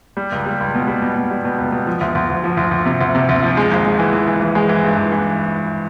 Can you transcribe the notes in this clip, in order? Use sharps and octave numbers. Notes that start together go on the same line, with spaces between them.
G3
C#2
G3
C#2
B2
G3
B2
B2
G3
B2
C#2
B2
F3
D2
D2
D2
F3
D2
D2
C3
D2
C3
D2
F3
G#3
G#1
G#3
E3
E3
E3
E3
G#3
E3
G2
E3
E3